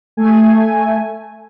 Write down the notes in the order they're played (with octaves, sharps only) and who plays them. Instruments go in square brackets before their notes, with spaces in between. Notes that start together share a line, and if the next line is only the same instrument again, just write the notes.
[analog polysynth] A3 G#5